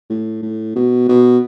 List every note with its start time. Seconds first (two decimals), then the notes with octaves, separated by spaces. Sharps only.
0.10 A2
0.42 A2
0.76 B2
1.09 B2